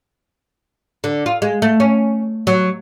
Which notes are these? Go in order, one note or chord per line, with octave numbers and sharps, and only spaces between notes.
D3
F4
G#3
A3
C#4
F#3